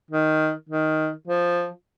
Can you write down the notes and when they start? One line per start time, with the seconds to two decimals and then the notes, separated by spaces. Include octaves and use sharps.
0.11 D#3
0.69 D#3
1.27 F3